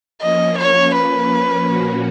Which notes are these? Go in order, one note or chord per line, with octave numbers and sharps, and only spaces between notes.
F3 A#3 C#4 D#5
C#5
B4
A#2 F3 A#3 C#4 F#4